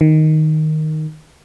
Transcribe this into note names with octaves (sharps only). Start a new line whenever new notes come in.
D#3